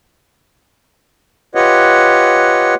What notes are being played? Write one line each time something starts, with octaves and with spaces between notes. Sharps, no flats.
F4 G4 B4 C#5 D#5 F#5